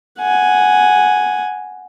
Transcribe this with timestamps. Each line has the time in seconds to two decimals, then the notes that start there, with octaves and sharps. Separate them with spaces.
0.20 F#5 G#5